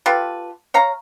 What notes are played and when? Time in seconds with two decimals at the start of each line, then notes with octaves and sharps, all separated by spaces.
0.06 F4 G4 A4 B4
0.74 C#5 F5 A#5